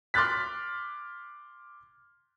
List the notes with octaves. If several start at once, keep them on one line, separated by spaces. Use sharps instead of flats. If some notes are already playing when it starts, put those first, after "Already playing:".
C6 D6 F6 F#6 A6 B6